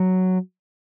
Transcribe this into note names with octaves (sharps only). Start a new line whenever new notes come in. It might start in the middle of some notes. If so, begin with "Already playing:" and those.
Already playing: F#3